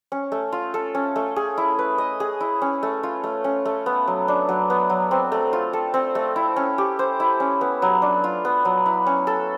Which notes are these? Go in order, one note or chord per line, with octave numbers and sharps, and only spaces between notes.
C#4
A3
F4
A4
C#4
A3
G#4
E4
B4
D#5
G#4
E4
C#4
A3
F4
A3
C#4
A3
B3
F#3
D4
F#3
B3
F#3
C4
A3
F4
A4
C4
A3
E4
C#4
G4
C5
E4
C#4
B3
F#3
D4
F4
B3
F#3
E4
C#4
A4